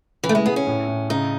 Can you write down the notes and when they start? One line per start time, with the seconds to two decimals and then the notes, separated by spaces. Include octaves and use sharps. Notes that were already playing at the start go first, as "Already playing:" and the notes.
0.23 C#3 E3
0.29 A3
0.35 G#3
0.45 B3 G#4
0.56 C#4
0.67 A2
0.88 A2
1.09 C#3 D#4